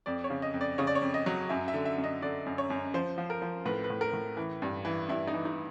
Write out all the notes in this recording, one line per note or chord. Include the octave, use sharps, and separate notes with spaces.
F2 D5
C#5
C#3
D#5
F2
D5
C#3 C#5
D5
C#5
F2
D#5
F#3
F#2 E5
E5
D3
E5
F#2
D#5
D3 D5
F#2
C#5
F#2
F3 C5
F3
A#4
F3
A2 B4
B4
A2
A#4
A2
E3
G2
E3
G2 E4
D#4
E3
D#4